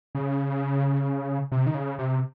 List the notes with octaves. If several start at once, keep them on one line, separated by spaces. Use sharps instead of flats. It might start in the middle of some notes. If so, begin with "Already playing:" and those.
C#3
C3
D#3
C#3
C3